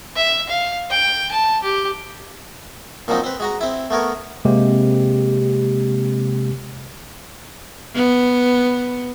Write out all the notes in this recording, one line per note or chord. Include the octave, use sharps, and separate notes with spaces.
E5
F5
G5
A5
G4
A#2 F3 F#3 C4 D#4
C4 B4
G#3 F#4 A#5
C4 E4
A3 B3 A#4 C#5
C3 G#3 A#3 C4 G4
B3